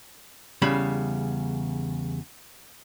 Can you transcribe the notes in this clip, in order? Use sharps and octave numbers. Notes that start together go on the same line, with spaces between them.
E2 C#3 G3 B5